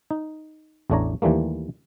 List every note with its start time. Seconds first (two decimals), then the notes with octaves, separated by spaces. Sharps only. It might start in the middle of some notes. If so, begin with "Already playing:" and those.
0.11 D#4
0.90 A1 E2 A3 D4 C#5 A#5
1.22 D#2 E3 G3 A3 A#3